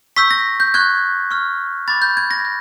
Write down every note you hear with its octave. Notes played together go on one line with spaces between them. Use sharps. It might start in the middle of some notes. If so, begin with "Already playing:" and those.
C#6 E6 G6 B6
A#6
G6
C#6 F#6 G#6
C#6 F6
B5 D6 G6 A6
G6
G#6
A#6
G6